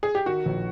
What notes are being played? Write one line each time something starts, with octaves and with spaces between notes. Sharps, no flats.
G#4
G4
D#3 F#4
A#1